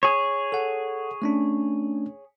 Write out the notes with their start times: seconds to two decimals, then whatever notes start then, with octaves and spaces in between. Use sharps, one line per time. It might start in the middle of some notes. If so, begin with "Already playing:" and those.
0.03 G#4 C#5
0.52 A4 F#5
1.22 A3 C#4 D4